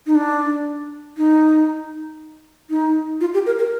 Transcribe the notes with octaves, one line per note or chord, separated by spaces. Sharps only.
D#4
D4
D#4
D#4
F4
G4
A#4
A#4